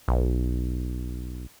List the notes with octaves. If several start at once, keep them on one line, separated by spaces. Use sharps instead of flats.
B1